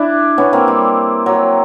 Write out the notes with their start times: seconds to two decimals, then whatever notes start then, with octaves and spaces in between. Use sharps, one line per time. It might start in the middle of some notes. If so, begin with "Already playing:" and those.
Already playing: D4 E4
0.38 B3 C#4
0.53 A#3 C4
0.68 G3
1.26 F#3